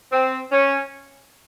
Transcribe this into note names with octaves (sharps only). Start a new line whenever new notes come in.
C4
C#4